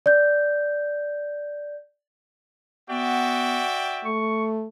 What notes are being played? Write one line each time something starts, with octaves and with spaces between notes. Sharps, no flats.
D5 G6
B3 F#4 D5 E5 G5
A3 C#6